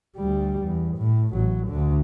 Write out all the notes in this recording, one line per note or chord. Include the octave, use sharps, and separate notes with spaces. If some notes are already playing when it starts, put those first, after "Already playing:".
D2 G3
E2
A2
A1 F#3
D2 D3